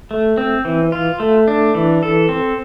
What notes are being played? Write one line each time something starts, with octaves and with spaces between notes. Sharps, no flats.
A3
C4
E3
F4
A3
D4
E3
A4
C4